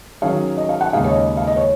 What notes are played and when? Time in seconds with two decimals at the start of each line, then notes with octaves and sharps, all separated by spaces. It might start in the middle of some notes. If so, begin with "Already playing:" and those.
0.22 D#3 F#3 C#4 G#4 C#5 F5
0.57 D#5
0.69 F5
0.81 F#5
0.93 D#2 C#3 G#3 D#4 G#4 F5
1.04 C#5
1.11 D#5
1.37 F5
1.47 D#5
1.56 C#5